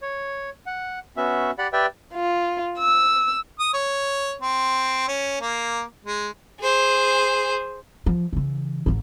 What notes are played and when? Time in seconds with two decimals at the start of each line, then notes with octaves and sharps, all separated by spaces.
0.02 C#5
0.66 F#5
1.17 B3 C#4 F#4 E5
1.58 G4 D5 F#5 B5
1.73 G4 B4 D5 E5 G5
2.14 F4
2.77 E6
3.59 D#6
3.74 C#5
4.42 C4
5.08 C#4
5.41 A#3
6.05 G#3
6.60 G#4 C5
8.06 F3
8.33 C#3 E3
8.86 G#1 G#2